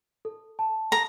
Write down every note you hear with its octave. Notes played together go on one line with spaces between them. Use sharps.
A4
A5
A4 A#5